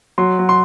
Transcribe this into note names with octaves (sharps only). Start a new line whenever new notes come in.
F#3 C6
F#3
C6